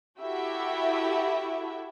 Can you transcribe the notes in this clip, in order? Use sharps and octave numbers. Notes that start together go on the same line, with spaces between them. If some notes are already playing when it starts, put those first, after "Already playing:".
E4 F#4 G4 A4 E5